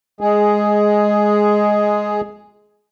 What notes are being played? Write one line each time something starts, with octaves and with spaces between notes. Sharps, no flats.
G#3 G#4